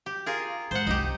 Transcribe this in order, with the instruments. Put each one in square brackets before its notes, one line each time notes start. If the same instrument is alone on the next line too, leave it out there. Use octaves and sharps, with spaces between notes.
[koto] G4
F4 G#4 A#4
[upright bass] G#2 [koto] C5 F#5
[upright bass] F#1 C2 [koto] D#4 G4